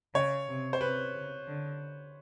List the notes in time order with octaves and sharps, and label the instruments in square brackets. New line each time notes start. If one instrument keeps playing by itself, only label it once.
[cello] C#3 [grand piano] C#5
[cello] C3
[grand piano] C5
[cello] C3 [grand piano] B4
[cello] C#3
D3